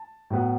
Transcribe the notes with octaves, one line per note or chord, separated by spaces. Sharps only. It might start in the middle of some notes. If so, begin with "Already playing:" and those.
Already playing: A5
A2 F#3 B3